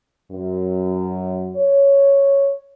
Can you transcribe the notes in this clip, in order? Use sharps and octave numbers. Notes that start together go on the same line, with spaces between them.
F#2
C#5